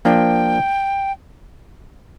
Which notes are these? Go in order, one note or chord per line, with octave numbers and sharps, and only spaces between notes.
F3 A#3 D4 G5